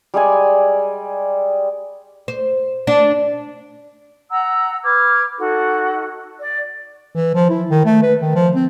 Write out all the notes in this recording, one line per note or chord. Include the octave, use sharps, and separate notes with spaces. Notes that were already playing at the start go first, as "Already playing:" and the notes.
G3 G#3 D5 G#5
C5
D4
F#5 A#5 E6
B4 D6 F6 G#6
D#4 F#4 A4
D5
E3
F3
E4
D#3
A3
B4
D#3
F3
C4